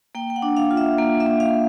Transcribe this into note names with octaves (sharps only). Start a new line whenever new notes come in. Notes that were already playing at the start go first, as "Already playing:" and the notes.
A#3 G5
G5
F#5
D4
F5
F4
E5
A#3
E5
A#3
F5